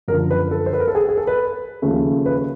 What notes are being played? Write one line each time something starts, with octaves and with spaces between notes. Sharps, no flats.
F#2 D3 F3 A#4
B4
A4
C5
B4
A#4
A4
G#4
G#4
A4
B4
D#2 C#3 F3 A3 C#4
B4